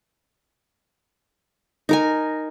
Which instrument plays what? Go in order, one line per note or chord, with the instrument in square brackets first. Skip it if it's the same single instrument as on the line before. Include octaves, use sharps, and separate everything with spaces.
[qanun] D#4 A#4 G#5